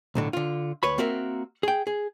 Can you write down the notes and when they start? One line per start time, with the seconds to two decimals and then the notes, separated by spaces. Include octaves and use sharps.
0.15 B1 A2 D3
0.33 D3 F4
0.83 D2 B4 C#5 B5
0.98 A#3 C4 F#4 A#4 E5
1.63 G#4 G5
1.87 G#4